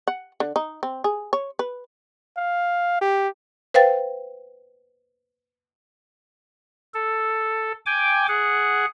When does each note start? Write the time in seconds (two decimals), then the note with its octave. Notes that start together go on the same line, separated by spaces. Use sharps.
0.08 F#5
0.40 D3
0.56 D#4
0.83 C4
1.04 G#4
1.33 C#5
1.59 B4
2.37 F5
3.01 G4
3.74 B4 C5 F5 G5 A6
6.94 A4
7.86 G5 G#5 D6
8.28 G#4 F#5